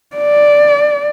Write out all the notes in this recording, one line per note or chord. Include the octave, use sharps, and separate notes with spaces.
D5